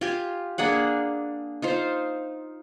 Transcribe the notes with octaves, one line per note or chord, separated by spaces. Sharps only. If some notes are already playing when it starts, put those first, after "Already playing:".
F4 G4 G#5
A#3 D4 G#4 F#5
D#4 F4 C5